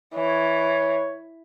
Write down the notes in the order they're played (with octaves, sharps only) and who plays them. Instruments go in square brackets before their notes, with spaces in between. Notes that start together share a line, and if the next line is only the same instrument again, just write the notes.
[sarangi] E3 [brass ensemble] C#5